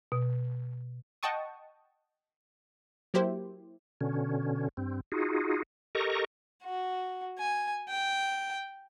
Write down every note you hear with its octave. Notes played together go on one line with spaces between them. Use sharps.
B2
D#5 F#5 G5 A5 C#6 D#6
F#3 A#3 E4 G4 C5
B2 D3 C#4
G2 C4
D#4 F4 F#4 G#4
G4 A4 A#4 D#5 A#5 C#6
F#4
G#5
G5